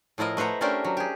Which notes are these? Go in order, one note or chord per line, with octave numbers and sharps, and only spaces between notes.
A2 F3 E4 A#4 D#5
A3 B4 C5 F#5 A#5
A3 C#4 D4 G4 A#4 C5
F#3
G4 G#4